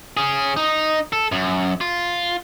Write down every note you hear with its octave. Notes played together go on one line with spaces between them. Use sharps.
C#4 G#4
D#4
A4
F#2
F4